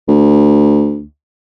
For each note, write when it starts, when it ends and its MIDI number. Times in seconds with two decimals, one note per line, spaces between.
0.08 1.03 38